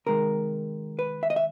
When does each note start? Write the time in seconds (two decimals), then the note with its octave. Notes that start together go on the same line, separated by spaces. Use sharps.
0.06 C3 D#3 G#3 A#4
0.99 B4
1.23 E5
1.30 D#5
1.36 E5